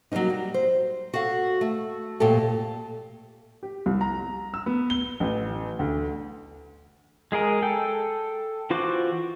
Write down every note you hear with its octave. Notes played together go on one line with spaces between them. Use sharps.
F#3 G3 A#3 C#4 D#4
G3
C5
F#4 A4 F5 F#5
A3
F2 A#2 A3 G4 A4
G4
C2
A#5
E6
B3
G7
A1
D2
G#3 G#4 A#4 D#5
A4 G5
E3 F4 F#4 C5 D6